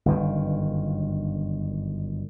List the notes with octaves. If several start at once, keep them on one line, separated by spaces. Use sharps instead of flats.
G1 F#2 D#3